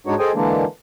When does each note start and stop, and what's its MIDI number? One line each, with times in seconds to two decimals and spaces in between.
0.07 0.15 44
0.07 0.15 56
0.07 0.15 62
0.07 0.15 63
0.07 0.15 66
0.07 0.15 73
0.19 0.32 68
0.19 0.32 69
0.19 0.32 72
0.19 0.32 75
0.19 0.32 79
0.19 0.32 80
0.35 0.64 50
0.35 0.64 52
0.35 0.64 56
0.35 0.64 58
0.35 0.64 62